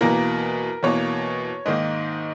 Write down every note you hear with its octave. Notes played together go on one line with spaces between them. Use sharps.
E2 B2 A#3 A#4
E2 B2 A#3 C#5
G#2 D#3 A#3 D#5